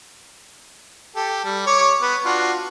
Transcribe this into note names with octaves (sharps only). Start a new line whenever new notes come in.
G4 A4
G3
C#5 C#6 D6
B3
D4 F4 F#4